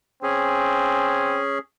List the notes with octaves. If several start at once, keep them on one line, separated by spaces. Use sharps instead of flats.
C4 C#4 G#4